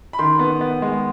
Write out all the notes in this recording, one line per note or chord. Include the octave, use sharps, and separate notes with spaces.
B5
D#3 C6
B3
B3
G#3